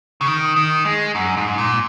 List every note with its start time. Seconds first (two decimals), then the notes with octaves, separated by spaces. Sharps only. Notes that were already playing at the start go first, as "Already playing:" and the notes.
0.21 C#3
0.27 D#3
0.56 D#3
0.85 G#3
1.15 F#2
1.37 G#2
1.58 A#2